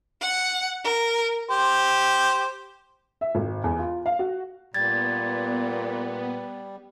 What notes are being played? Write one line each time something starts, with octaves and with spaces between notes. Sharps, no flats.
F#5
A#4
G4 C5
E5
G#1
E2
F4
F5
F#4
A#2 G3 B3 G#6 A6